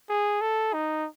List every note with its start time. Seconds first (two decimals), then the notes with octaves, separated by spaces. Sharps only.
0.10 G#4
0.41 A4
0.74 D#4